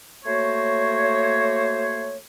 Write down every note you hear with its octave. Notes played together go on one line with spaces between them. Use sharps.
A3 A#3 F#4 C5 C#5